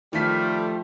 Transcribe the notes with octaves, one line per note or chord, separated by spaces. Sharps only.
D#3 F3 G3 A3 F4 F5 F6 B6